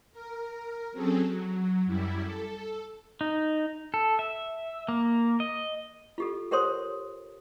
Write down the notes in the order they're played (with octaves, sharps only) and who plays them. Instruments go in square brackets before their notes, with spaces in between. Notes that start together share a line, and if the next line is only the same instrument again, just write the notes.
[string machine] A#4
F#3 C4 C#4 G#4 A4
F#3
F#2 G3 E4
A4
[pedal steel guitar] D#4
A4
E5
A#3
D#5
[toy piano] F4 G4 A4
G4 A#4 C5 C#5 C6 D#6